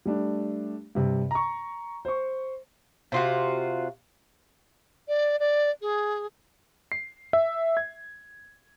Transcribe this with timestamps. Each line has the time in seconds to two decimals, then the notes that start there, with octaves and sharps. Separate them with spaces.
0.05 G3 A3 D4
0.95 G2 C3
1.31 A#5 C#6
2.05 C5 C#6
3.12 C3 F4 F#4
5.08 D5
5.40 D5
5.82 G#4
6.92 C7
7.33 E5
7.77 G#6